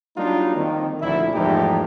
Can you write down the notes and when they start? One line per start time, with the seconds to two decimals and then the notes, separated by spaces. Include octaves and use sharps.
0.17 F#3 G3 A#3 D4 D#4 F4
0.56 F2 D#3
1.01 D2 A#2 F3 E4
1.34 E2 G#2 F3 A3 D#4 G4